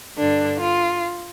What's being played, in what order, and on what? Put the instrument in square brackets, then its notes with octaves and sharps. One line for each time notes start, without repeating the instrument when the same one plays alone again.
[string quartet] G2 D3 D4
F4